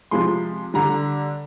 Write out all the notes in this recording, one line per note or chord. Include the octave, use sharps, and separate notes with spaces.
C3 F3 G#3 C6
D3 G3 A#5